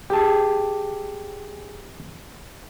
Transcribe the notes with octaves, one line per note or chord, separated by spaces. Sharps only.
G4 G#4 A5